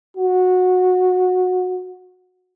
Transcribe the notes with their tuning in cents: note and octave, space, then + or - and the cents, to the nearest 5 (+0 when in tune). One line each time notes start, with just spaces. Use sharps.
F#4 -15